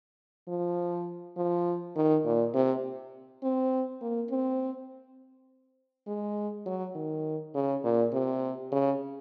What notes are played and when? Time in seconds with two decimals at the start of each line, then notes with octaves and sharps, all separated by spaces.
0.48 F3
1.37 F3
1.96 D#3
2.25 A#2
2.55 C3
3.43 C4
4.02 A#3
4.30 C4
6.07 G#3
6.66 F#3
6.96 D#3
7.55 C#3
7.84 A#2
8.13 C3
8.72 C#3